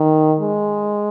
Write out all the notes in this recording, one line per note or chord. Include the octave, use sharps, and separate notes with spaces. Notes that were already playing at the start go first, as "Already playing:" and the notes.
Already playing: D#3
G#3